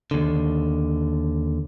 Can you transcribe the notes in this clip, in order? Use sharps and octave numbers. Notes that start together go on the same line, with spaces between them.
D#2 D3